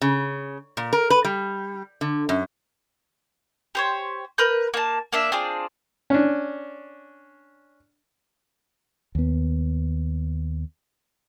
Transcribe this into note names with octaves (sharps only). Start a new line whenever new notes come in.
C#3
A#2
A#4
B4
G3
D3
F#2
G4 C5 C#5
A#4 B4 G6
A#3 A5
A#3 D4 E5
C4 D4 F4 G#4
C#4 D4
D#2 B3